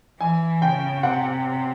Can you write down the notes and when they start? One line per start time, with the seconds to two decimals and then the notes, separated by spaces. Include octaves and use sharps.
0.20 E3 G#5
0.61 C#3 G5
1.03 C3 F#5